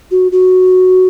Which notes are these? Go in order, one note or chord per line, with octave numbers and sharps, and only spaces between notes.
F#4
F#4